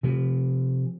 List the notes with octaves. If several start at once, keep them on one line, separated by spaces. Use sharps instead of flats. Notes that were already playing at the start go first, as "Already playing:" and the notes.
C3 F3